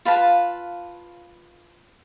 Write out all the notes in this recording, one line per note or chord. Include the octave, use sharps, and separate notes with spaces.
F4 B4 F5 A5